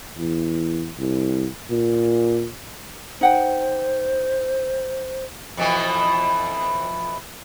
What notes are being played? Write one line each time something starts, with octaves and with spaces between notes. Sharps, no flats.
E2
C2
A#2
D#4 C5 F#5 G5
F2 B2 E3